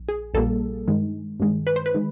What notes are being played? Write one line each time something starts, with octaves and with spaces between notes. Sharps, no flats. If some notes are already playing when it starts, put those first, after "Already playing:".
Already playing: A#1
G#4
A#1 A#2 G3 A#3 A4
G2 D#3 G#3
G2 D#3 G#3
B4
C5
B4
D#3 G#3